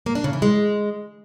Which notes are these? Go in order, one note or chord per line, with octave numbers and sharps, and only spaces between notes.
A#3
D4
C#3
E3
G#3